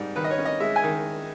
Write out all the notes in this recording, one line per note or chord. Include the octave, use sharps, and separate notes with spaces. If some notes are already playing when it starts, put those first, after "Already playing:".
Already playing: G#2 G3
D#3 B4
D#5
C#5
C#4
D#5
G#3 E5
G#5
D#3